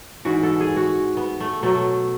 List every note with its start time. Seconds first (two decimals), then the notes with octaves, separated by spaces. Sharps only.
0.25 G#2 E3 F#4
0.43 A4
0.60 G#4
0.77 F#4
1.17 B3
1.40 A3
1.63 B2 F#3 A3